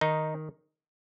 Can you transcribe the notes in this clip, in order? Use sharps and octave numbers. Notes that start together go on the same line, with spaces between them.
D#3 D#4